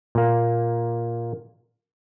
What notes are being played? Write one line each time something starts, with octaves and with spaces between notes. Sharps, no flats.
A#2 A#3